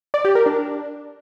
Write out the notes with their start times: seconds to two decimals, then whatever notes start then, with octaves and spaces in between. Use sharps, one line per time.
0.14 D5
0.25 G4
0.35 A#4
0.46 D4